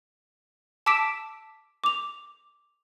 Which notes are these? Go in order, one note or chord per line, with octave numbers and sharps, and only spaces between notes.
A5 D6 E6 B6 D7 E7
D6 F7